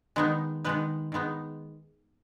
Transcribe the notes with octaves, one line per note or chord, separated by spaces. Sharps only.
D#3 G#3 B3 D#4
D#3 G#3 B3 D#4 B4
D#3 G#3 B3 D#4